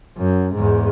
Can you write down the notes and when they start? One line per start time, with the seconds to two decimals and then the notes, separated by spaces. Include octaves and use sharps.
0.18 F#2
0.56 E2 G#2